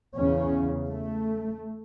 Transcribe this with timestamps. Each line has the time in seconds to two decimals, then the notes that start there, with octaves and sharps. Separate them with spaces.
0.17 E2 C#3 C#4
0.89 A3